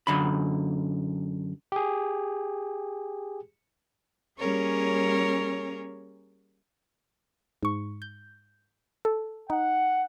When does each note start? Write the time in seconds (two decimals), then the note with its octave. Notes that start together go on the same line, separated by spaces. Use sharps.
0.07 F#2 D3 B5
1.72 G4 G#4
4.38 G3 A#3 C#4 G#4 A#4 C#5
7.63 G#2 C#6
8.02 G6
9.05 A4
9.50 D#4 F#5